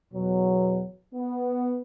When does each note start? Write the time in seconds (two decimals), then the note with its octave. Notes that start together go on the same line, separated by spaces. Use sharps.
0.13 E2 B2 F#3
1.15 B3